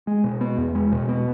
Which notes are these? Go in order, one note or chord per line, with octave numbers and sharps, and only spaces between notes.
G#3
B2
B3
E2
G#3
B2
B3